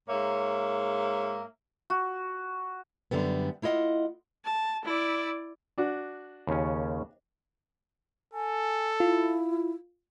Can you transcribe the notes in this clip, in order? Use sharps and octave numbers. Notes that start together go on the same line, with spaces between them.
G#2 A#3 C#5 E5
F#4
F#2 D3 G3 B3
A3 E4 F4 D#5 F#5
A5
E4 D5
D4 F#4
D#2 C#3 C#4
A4 G#5
E4 F4